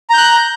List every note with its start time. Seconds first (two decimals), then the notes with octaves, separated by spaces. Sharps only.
0.10 A#5
0.14 G6
0.18 F#6